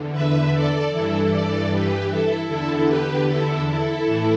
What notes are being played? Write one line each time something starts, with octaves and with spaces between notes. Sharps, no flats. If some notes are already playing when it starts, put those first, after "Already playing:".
Already playing: E2 D3
B4 E5
A4 D5
G2 E3 E4 A4
A4 D5
G4 B4
E4 A4
E2 D3 E4 A4
G4 B4
E4 A4
E4 A4
A2 E3